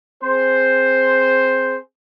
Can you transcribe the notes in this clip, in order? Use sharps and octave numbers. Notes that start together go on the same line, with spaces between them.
C4 G#4 C5